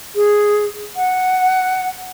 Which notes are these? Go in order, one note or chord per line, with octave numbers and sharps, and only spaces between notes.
G#4
F#5